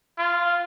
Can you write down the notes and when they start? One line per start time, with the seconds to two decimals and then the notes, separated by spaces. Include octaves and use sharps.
0.18 F4